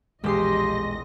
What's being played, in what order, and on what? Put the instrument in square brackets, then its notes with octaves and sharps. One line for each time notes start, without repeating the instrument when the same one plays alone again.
[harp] E1 C6 [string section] A#1 D#5 A#6 [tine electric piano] G#3 G#4 [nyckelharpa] G4